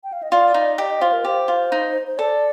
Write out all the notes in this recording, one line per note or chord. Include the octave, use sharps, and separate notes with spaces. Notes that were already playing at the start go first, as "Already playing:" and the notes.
G5
F5
D#5
F4 D5
D#4
G4 D#5
D#5
F4 C5
A#4
G4 C5
F4
D#4
C5
A4 D5